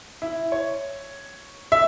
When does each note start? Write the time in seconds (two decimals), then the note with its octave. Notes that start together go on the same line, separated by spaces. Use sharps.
0.22 E4
0.52 C#5
1.72 E5